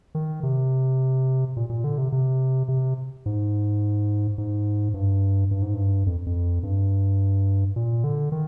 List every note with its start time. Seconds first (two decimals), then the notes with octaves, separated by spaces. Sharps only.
0.15 D#3
0.43 C3
1.57 A#2
1.70 A#2
1.84 D3
1.98 C3
2.12 C3
2.68 C3
3.26 G#2
4.38 G#2
4.94 G2
5.51 G2
5.62 G#2
5.74 G2
6.06 F2
6.26 F2
6.63 G2
7.76 A#2
8.04 D3
8.32 D#3